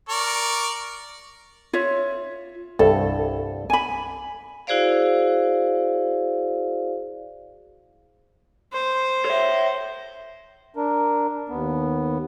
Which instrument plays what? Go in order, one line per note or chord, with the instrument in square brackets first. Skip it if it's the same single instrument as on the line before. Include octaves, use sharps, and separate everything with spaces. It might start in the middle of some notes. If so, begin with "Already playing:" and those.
[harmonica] A#4 D5 C#6
[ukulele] F4 C#5 E5
[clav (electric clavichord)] C2 G2 [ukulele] A4
[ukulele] G#5 B5
[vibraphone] E4 F#4 G#4 C5 D5 F5
[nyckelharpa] C5
[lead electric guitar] C#5 E5
[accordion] D4 A#4
D#2 B3